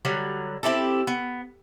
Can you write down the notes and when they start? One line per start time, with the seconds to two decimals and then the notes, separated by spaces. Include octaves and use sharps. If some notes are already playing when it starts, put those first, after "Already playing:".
0.05 D3 F#3 G3
0.63 C4 E4 G4 A4
1.07 B3